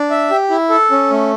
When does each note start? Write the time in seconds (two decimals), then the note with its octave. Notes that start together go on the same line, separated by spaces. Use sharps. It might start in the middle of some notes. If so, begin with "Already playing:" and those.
Already playing: D4
0.11 E5
0.30 G4
0.50 E4
0.70 A4
0.91 C#4
1.11 A3